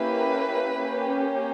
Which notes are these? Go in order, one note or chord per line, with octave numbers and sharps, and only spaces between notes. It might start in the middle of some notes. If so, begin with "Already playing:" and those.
Already playing: A#3 C#4 E4 G4 B4
A#3 C#4 G4